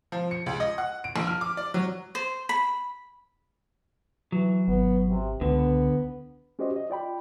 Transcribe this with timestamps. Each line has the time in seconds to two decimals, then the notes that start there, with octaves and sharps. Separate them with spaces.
0.12 F3
0.31 C#7
0.46 C#2
0.60 D#5
0.78 F#5
1.04 D7
1.16 A#1
1.27 F6
1.41 D6
1.57 D5
1.74 F#3
2.15 C5
2.49 B5
4.32 E3 F#3
4.68 G#1 B3
5.09 C3
5.41 C#2 D3 B3
6.59 C#4 F#4 G4 C5 D5 D#5
6.76 D#5
6.90 F4 D5 G5 B5